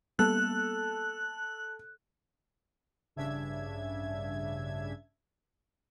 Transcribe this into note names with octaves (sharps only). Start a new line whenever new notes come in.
G3 A#3 B3 A4 F#6
A1 G2 C#3 D4 E5 G#6